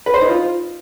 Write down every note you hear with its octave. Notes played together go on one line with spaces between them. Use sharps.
B4
C5
D#4
F4